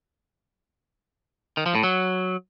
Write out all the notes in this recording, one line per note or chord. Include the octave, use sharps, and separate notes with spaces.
D#3
F3
A2
F#3